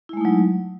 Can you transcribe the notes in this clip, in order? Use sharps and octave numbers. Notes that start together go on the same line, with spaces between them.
F#3 G#3 A3 D#4 E4